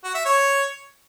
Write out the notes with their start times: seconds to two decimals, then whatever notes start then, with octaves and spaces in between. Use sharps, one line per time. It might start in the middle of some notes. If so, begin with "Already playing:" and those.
0.04 F#4
0.15 E5
0.25 C#5